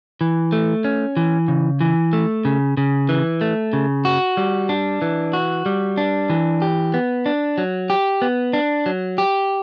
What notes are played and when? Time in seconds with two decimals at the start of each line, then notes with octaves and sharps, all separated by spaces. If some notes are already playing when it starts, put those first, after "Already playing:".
0.21 E3
0.52 A3
0.85 C#4
1.17 E3
1.48 C#3
1.81 E3
2.13 A3
2.45 C#3
2.77 C#3
3.09 E3
3.41 A3
3.73 C#3
4.05 F#4
4.37 G3
4.69 D4
5.02 E3
5.33 F#4
5.66 G3
5.97 D4
6.30 E3
6.62 G4
6.94 B3
7.26 D4
7.58 F#3
7.90 G4
8.22 B3
8.53 D4
8.86 F#3
9.18 G4